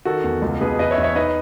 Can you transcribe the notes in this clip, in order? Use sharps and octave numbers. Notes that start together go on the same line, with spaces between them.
D#3 F#4 A4
E2
C#2
B2 G#4 B4
E2 B4 D#5
C#5 E5
E2
C#5 E5
D#4 B4 D#5